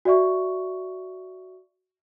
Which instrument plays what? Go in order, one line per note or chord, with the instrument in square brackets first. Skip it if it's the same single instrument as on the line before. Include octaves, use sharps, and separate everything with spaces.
[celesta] F#4 D5 E5 C#6